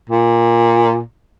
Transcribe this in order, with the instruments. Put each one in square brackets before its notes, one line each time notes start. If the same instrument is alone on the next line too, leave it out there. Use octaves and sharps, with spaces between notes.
[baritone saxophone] A#2